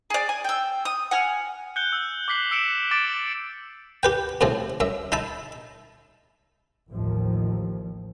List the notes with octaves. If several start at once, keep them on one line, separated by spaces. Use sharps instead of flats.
G#4 D5
G#5
G5 E6
D#6
F#5 G#5 F6
F#6 G6 C#7 G7
E6
D6 F#6 B6 C7 F#7
E6 B6 C#7 D7 E7
D6 A6 D7 E7
G4 B4 G5
F#2 A2 C3 F3 C4
F#2 E5
D#4 E5 A5 B5
A1 D#2 F3